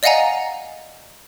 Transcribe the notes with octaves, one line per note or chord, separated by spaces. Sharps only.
D5 D#5 F5 F#5 G#5 A#5